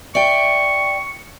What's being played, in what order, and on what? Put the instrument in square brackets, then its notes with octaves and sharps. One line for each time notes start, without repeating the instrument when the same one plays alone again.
[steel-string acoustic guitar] D5 E5 G5 [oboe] C#6